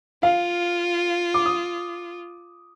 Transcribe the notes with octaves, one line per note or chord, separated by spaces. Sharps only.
F4 F5
D6
D#6